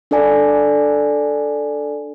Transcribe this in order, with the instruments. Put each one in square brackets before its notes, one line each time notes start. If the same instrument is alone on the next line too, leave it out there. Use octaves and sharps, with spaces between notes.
[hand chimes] D4 A4 D5 G#5